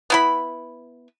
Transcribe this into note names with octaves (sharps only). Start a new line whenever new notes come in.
B3 E4 B5